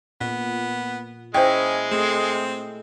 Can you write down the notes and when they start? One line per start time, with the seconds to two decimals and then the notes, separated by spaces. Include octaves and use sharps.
0.21 A#2 B3
1.34 G#3 C#4 E4 C5 D#5 E5 G5
1.91 A3 C4 G#4